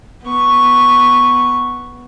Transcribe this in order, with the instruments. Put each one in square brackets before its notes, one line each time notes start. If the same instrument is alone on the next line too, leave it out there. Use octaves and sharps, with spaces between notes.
[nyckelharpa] B3 C#6